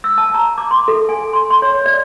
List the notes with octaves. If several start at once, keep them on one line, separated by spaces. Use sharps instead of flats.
E6
A5
A#5
D6
C6
A4
G#5
C6
C6
C#5
D5